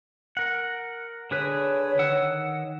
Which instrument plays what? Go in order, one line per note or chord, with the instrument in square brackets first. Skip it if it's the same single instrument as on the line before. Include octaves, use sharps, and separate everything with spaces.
[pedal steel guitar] A#4 F#5
[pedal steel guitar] D3 G#4 B4 [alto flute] C#5
[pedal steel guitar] D#3 F#5 E6